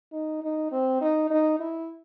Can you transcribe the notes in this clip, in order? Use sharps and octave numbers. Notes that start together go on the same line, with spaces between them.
D#4
D#4
C4
D#4
D#4
E4